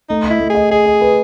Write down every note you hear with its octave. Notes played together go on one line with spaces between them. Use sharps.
A3 D#4
E4 D#5
A3
G#4
D#5
G#4 D#5
D#5
B4